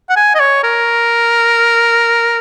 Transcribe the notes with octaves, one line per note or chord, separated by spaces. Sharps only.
F#5
G#5
D#5
C#5
A#4